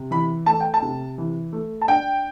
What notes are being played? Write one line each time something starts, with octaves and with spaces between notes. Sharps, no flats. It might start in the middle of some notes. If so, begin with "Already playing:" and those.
Already playing: C3
E3 B5
A3 A5
G5
A5
C3
E3
A3
A5
D4 G5